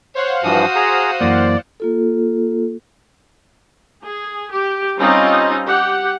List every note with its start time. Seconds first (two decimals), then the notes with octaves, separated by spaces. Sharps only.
0.15 C5 C#5 F5 F#5
0.43 G2 E3 F3 F#4 D#6
0.76 G#4 A#5
1.21 F#2 E3 A#3 D5
1.80 A#3 F4 A4
4.04 G#4
4.51 G4
4.97 G3 C4 C#4 D#4 F4 D#5
5.67 G4 F#5